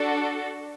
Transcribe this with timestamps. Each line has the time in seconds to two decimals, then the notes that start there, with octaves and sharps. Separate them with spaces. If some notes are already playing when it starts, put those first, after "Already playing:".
Already playing: D4 F#4 A4